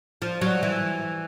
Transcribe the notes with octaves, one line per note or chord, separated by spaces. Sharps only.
F3
F#3
E3